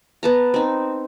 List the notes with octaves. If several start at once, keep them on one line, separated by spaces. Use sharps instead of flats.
B3 A5 A#5
C4 D#4